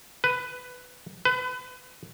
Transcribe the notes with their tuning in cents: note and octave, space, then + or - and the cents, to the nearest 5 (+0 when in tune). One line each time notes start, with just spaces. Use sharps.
B4 +10
B4 +30